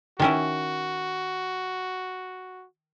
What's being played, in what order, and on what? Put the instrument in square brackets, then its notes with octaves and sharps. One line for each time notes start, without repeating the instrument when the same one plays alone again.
[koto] D#3 C#4 E4 [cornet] F#4